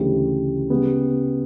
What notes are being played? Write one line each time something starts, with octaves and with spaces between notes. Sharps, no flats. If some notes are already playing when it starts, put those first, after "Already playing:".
Already playing: D2 C#3 E3 G3
C#3 G3 B3